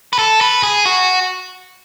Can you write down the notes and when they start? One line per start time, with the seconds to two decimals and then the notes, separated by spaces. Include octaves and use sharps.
0.13 B4
0.19 A4
0.41 B4
0.63 G#4
0.85 F#4